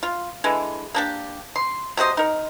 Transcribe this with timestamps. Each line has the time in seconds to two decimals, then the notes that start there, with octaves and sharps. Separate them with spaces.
0.03 F4
0.44 D3 E3 G#3
0.94 A#3 D4 G4
1.56 C6
1.97 C3 F#4 C5 D#5
2.17 D#4 A#4